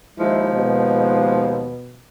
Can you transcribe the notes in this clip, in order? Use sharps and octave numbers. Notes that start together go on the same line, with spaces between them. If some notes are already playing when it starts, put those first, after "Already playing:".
D#2 F3 G#3 E4
B2